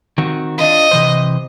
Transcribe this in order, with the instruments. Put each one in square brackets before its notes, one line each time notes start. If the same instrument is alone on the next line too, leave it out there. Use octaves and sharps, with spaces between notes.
[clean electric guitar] D#3 C4 F#4
[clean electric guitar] D4 F4 [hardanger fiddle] D#5
[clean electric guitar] C3 E3 C5